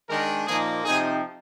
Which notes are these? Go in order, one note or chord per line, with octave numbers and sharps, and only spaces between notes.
D#3 G#3 D4 A#4
A#2 F3 A#3 D#4 G#4
C3 F3 C4 D#4 G#4